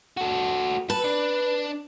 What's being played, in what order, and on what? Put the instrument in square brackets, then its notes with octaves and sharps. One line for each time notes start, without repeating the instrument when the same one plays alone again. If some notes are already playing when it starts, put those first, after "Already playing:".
[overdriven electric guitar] F#4 A4
[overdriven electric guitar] A4 [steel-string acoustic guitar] B4
[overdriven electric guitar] D4